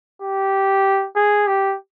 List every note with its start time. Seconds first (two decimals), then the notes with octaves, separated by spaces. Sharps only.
0.22 G4
1.16 G#4
1.47 G4